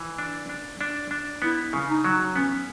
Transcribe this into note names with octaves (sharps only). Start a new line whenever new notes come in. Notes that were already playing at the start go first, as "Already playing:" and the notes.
Already playing: E3
D4
D4
D4
D4
B3 E4
C#3
D#4
F#3
B3 C#4